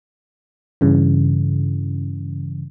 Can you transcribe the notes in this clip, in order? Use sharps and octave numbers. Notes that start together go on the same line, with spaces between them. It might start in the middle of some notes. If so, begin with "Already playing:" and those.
G2 C#3 E3